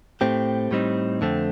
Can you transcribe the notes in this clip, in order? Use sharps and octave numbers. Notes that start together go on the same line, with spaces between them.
A2 A3 C4 G4
A2 G3 C4 D#4
F2 D3 A3 C4